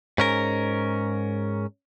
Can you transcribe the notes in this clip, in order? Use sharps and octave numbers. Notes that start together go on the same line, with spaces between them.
G#2 C#4 A#4